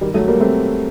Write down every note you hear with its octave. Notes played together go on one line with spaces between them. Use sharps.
D#3 G3
F#3 A3
G3 A#3
A3 C4